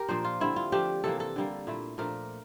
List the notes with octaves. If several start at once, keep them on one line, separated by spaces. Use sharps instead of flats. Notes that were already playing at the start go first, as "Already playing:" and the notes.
Already playing: G4 A#4
A#2 F3 A#3 D4 C5
F4
D3 G3 C4 E4
F4
F3 A3 D4 G4
C3 E3 A#3 A4
A4
D3 G3 A#3
A#2 A3 E4
A#2 F3 A3 D4 A#4